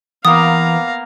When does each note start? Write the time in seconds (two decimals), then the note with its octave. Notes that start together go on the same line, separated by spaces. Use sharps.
0.25 E3 A#3 B3 F5 A#5 D#6